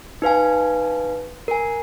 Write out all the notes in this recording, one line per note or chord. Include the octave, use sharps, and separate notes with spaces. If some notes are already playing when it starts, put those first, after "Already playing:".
D#4 B4 F5 G#5
A#4 G#5